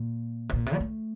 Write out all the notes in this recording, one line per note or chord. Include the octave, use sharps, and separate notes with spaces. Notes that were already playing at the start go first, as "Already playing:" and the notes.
Already playing: A#2
C3
A#2
C3
G3
A3